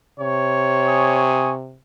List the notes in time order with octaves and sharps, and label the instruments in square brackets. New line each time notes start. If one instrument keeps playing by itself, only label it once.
[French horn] C3 [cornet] C#5
[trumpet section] G#5 C#6 D#6